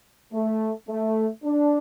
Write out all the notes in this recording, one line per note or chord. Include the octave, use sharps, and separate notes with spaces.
A3
A3
D4